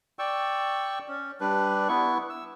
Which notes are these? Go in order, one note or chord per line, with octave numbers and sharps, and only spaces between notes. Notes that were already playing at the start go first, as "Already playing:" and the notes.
D5 G5 C#6 E6
C#4
G3 D4 B4
B3 E4 C#6
E6